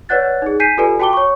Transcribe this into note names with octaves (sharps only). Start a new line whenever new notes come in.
B4 C#5 D5 F#5 F#6 A6
D#4 G#4
G#5 G6 B6 C7 D#7
F4 G4 A4 B4 D5 G#5
F#4 G5 A5 D6 G7
C#5 C#6